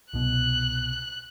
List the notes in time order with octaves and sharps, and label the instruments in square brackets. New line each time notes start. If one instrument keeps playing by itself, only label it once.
[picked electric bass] C2 B2 [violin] F#6